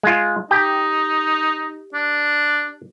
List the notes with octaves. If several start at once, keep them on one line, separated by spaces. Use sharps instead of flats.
G#3 F4
D#4 G4 G5
D4